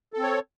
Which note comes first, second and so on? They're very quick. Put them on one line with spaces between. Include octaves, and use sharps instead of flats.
A4 C4 C#5